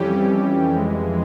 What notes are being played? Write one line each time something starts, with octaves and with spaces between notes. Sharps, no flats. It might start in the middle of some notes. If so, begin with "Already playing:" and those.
Already playing: F2 E3 G3 C#4 G4
F2 E3 G#3